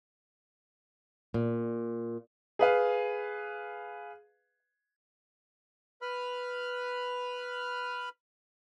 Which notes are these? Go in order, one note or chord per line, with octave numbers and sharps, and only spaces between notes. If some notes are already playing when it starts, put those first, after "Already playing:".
A#2
G#4 B4 F5
B4 B5 F6